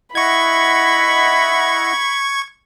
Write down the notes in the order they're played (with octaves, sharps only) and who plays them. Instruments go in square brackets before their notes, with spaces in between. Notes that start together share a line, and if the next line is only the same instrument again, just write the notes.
[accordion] E4 D#5 F#5 [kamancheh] B5 [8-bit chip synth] C#6 G#6